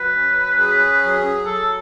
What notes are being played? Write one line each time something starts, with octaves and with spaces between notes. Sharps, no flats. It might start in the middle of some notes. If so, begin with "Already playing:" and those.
Already playing: F#3 B4
C#4
G#4
F#3
F#3 A4